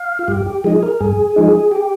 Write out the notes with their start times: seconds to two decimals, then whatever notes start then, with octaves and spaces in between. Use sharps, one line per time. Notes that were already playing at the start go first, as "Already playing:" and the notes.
Already playing: F5
0.19 F4
0.28 G2 G4
0.46 G4
0.64 F3 G#3 D#4 G#4
0.83 A#4
1.00 G2 G#4
1.36 F3 G#3 D#4
1.71 G4